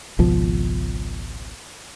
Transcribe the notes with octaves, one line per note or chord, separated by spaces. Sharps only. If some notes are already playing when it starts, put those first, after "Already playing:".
G#1 C#2 B2 F3